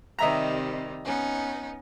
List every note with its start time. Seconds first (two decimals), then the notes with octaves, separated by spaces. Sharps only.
0.19 C3 D#3 G3 D#5 E5 A#5
1.03 B3 C#4 D#4